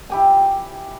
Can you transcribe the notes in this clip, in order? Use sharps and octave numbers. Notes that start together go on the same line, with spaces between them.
E4 G4 G#5